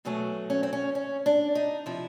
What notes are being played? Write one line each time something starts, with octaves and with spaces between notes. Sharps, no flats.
B2 F#3 A3 G#4
C#4
C4
C#4
C#4
D4
D#4
C3 F3 E4